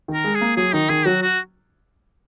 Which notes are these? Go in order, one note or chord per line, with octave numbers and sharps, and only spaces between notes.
D#3
A#4
G#3
G#4
A#3
F#3 G#4
D#3 D#4
D#3 G#4
F#3 F#4
F#4